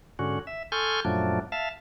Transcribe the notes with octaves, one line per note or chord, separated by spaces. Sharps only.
G#2 D3 C#4 F#4
E5
A4 G#5 C6 C#6 F6 G6
F#2 A#2 F3 F#3 A3 D4
E5 F5 A5